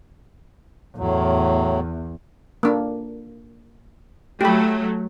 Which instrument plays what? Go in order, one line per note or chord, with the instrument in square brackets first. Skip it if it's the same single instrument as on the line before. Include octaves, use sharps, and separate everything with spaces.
[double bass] E2 [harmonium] A2 F#3
[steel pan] A#3 D4
[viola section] F#3 A3 [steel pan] G4 B5